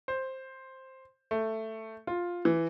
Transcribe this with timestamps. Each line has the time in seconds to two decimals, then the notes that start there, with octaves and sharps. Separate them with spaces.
0.08 C5
1.31 A3
2.07 F4
2.45 E3